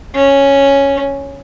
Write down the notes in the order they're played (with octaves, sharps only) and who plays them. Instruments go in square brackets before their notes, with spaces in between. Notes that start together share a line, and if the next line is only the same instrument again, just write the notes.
[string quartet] C#4